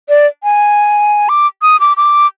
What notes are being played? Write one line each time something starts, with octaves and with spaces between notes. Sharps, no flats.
D5
G#5
D6
D#6
D6
D6